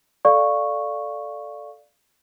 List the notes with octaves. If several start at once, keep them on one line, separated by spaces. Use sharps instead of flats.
A4 D5 F5 C#6